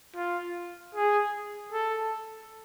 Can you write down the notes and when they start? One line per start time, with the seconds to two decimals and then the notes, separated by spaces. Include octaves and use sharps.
0.16 F4
0.95 G#4
1.72 A4